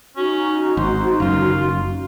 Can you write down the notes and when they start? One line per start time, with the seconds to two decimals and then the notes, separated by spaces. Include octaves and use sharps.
0.16 C#4 D#4 F#4
0.77 G#1 C5
1.20 F#1 F#2 F4